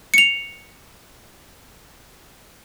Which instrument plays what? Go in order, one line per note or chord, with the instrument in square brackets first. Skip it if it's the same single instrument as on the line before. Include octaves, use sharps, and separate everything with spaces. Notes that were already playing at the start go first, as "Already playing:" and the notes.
[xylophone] C#7 F7